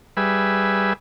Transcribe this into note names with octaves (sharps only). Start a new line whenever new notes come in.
G3 G#4 B4 E5